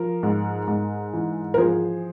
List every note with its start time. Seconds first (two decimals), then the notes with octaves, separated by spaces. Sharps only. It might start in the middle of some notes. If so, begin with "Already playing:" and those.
Already playing: F3 A#4
0.23 G#2
0.68 G#2
1.13 E3
1.54 A#4
1.58 F3 G#4 C5